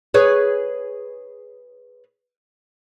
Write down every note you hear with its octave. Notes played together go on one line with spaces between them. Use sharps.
G#4 B4 C#5